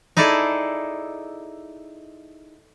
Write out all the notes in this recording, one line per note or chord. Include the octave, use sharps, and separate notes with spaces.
D#4 E4 G#4 A4 D5